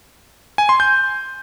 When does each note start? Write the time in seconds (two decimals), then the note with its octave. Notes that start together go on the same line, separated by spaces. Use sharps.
0.58 G#5
0.69 C6
0.80 G6